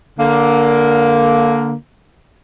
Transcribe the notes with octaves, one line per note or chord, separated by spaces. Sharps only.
D3 A#3